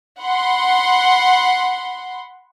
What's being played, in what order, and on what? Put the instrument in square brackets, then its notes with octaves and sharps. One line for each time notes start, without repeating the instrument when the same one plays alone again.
[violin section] F#5 B5 C6